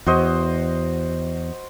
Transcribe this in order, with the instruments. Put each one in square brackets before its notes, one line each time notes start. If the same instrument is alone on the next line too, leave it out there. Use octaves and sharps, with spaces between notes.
[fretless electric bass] E2 [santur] F#4 C5 D#5